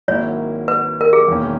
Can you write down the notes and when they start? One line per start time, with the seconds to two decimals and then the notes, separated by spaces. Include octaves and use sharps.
0.08 G#1 G#2 F#3 A#3 E4 C#5
0.68 B4
1.01 A#4
1.13 G#4
1.27 E1 E2 D#3 A#3 C#4